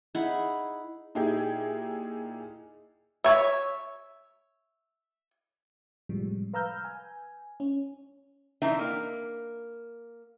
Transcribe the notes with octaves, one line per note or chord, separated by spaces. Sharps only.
D#4 E4 G#4 F#5
A#2 D#4 E4 G4 G#4
C#5 E5
A2 C3 F3 G3 G#3
B4 F5 A#5 E6 F6 G6
G#5
C#4
E3 C4 D4 D#4 E5
A#3